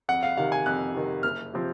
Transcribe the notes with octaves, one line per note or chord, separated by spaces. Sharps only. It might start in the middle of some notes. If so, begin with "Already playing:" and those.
F2 F#5
F5
C3 D#3 F5
G#5
F2 F#6
C3 D#3
F#1 F6
C3 F3 C4